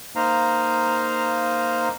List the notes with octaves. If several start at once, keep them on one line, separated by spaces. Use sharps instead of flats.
A#3 D#4 C5 F5 A#5